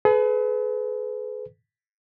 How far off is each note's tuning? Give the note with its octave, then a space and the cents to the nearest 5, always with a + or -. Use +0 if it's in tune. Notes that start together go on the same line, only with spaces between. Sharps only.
G#4 +45 B4 +25